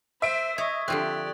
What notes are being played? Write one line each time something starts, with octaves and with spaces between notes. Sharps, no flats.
C5 E5 D7
C#5 D#5 C#6 D#6 G#6
D3 F3 C4 G4 D5 F#6